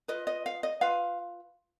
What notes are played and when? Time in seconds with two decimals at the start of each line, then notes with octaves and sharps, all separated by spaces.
0.08 F4 B4 D#5
0.27 D#5
0.46 F5
0.63 D#5
0.81 F4 B4 F5